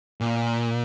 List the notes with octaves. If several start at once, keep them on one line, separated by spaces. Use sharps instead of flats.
A#2